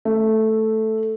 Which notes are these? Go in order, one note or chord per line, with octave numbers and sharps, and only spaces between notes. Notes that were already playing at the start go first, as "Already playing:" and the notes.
A3